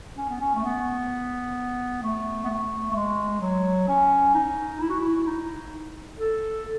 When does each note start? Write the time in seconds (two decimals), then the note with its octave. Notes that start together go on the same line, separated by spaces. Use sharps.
0.17 C#4
0.29 B3
0.41 C#4
0.55 A3
0.64 B3
2.03 A3
2.44 B3
2.50 A3
2.91 A3
2.95 G#3
3.41 F#3
3.88 C#4
4.35 D#4
4.80 E4
4.89 F#4
4.99 E4
5.27 D#4
6.19 A4